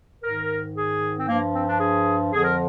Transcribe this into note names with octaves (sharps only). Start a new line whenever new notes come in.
G#2 D#3 A#4
G#4
C4
G2 F3 A#3
C4
D4
G#4
F2 D3 F3 G#4
A#4